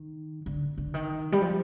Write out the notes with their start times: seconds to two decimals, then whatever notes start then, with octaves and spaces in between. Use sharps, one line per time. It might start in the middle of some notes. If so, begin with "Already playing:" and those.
Already playing: D#3
0.46 D3
0.78 D3
0.94 D#3
1.32 G3
1.41 F3